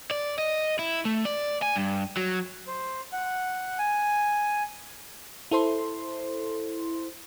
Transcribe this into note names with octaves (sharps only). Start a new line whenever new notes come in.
D5
D#5
E4
A3
D5
G#5
G2
F#3
C5
F#5
G#5
E4 A4 C5 C6